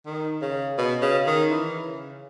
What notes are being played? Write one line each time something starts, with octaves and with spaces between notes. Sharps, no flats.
D#3
C#3
B2
C#3
D#3
E3
C#3